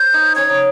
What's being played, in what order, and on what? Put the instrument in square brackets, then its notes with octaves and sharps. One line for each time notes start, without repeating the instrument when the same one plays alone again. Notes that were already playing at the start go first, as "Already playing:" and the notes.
Already playing: [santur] C5 [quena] G6
[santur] D#4
[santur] C#4 [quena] G#6
[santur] D#4